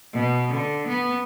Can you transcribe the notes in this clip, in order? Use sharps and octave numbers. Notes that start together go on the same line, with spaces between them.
B2
D3
B3